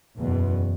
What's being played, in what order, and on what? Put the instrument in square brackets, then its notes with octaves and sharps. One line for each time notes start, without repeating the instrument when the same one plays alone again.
[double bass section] F#1 E2 B2